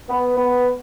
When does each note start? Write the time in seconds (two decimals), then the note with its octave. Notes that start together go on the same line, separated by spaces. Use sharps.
0.09 B3
0.37 B3